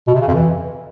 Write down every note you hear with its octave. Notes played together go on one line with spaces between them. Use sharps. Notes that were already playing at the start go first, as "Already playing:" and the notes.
B2
C3
C#3
F2
E3